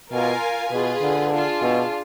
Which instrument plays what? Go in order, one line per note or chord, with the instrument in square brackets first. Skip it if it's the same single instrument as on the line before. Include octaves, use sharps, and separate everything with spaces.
[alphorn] B2 [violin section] F4 A#4 F5 G#5
[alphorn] B2 [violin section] F4 G#4 B4
[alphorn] D3
[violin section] D4 F4 G#4
[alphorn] B2